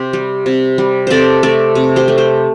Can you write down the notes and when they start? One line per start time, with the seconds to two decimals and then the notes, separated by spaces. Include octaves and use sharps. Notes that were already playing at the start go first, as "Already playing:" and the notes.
Already playing: C3 G4 C5
0.13 G3
0.46 C3
0.78 G3
1.07 C3 A4 C5 D5
1.43 A3 A4 D5
1.75 C3
1.96 G4 C5
2.08 A3
2.18 G4 C5